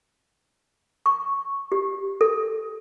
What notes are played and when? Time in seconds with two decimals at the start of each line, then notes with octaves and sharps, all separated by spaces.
1.06 C#6
1.72 G4
2.21 A4